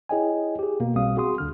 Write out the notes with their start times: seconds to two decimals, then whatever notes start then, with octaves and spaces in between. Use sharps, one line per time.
0.09 E4 G#4 C#5 D#5 G5 G#5
0.59 G4 G#4
0.80 B2 A#3
0.95 B1 B2 G3 C4 F5 D#6
1.17 F#4 G#4 C6 D#6
1.38 D2 D3 F6